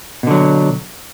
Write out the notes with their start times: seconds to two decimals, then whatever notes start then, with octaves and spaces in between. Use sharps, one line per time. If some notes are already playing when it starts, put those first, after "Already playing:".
0.23 B2
0.27 D3
0.31 F#3